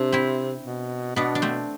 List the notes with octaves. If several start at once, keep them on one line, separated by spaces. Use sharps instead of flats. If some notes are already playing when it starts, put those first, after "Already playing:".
Already playing: C3 D4
C4 E4
B2
B2 B3 D4
D4
A3 C4